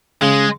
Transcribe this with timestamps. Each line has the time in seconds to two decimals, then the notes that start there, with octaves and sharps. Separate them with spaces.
0.22 C#3 G#3